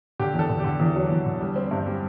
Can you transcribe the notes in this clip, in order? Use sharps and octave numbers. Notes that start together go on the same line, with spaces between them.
D3 G4
E2
A4
D3
G4
D3
E2
F#3
E2
D3
G3
C4
G2
G3